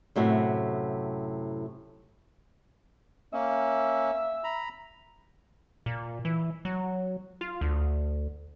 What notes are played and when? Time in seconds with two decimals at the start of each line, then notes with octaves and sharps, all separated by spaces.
0.16 F#2 A2 C3 F#4
3.33 A#3 C#4 E5
4.44 A#5 B5
5.86 A#2
6.25 E3
6.65 F#3
7.41 F4
7.61 D2